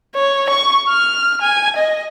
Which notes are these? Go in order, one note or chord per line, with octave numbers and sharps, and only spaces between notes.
C#5
C#6
F6
G#5
D#5